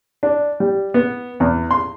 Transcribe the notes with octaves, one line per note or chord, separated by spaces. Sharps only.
D4
G3
B3
E2
C6